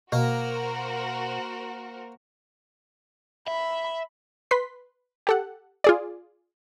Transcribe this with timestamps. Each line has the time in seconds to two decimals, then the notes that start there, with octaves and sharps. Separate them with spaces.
0.12 B2 A#3 F#4 A#4 C5
3.48 E5 B5
4.51 B4 C6 B6
5.27 G4 A4 F#5
5.84 F4 G#4 D5